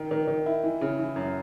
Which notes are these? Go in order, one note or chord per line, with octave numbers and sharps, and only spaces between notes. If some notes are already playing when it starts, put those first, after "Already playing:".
Already playing: D#3
D#3
D#3
E4
E3
C#3
E3
F#2